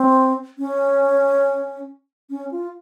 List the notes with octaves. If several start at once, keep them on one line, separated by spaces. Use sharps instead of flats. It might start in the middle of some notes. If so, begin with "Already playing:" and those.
Already playing: C4
C#4
C#4
F4